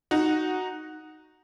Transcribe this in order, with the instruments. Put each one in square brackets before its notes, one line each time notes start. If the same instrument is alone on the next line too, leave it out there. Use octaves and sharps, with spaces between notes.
[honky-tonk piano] D#4 F#4